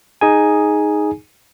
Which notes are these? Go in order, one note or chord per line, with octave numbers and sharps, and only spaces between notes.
D#4 G#4 G#5